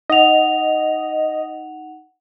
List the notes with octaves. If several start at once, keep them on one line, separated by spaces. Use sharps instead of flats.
D#4 D#5 F#5 F7